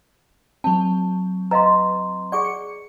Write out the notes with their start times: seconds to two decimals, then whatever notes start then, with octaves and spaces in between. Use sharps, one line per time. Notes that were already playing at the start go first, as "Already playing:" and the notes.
0.64 F#3 C4 A5
1.51 B4 D#5 F5 A#5 C6
2.32 G#4 D5 F#5 C#6 D6
2.45 C#7